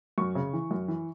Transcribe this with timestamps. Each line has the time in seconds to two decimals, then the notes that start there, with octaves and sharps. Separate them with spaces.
0.18 F#2 C#6
0.35 C#3
0.53 E3
0.71 F#2
0.88 E3